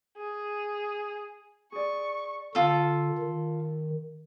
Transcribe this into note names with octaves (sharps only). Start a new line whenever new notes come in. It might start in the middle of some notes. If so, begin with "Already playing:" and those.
G#4
G#4 D5 C#6
D3 F4 A4
D#3